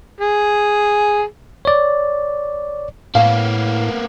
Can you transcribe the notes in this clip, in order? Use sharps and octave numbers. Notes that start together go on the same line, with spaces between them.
G#4
C#5 D5
A2 A#3 B3 F5